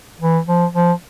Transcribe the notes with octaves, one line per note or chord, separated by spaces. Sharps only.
E3
F3
F3